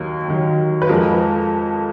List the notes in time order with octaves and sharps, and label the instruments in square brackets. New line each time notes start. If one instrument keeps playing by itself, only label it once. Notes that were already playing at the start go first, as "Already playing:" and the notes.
Already playing: [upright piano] D#2 D#3 F#3 A#4
D#2 D#3 F#3
B4
F2 F3 G#3 A#4